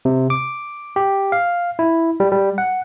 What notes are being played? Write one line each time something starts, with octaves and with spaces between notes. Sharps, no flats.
C3
D6
G4
F5
E4
G3
G3
F#5